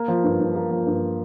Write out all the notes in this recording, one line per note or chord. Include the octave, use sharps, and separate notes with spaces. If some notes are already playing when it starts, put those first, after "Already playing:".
Already playing: A#3
F3
G2
G2
A#3
F3
G2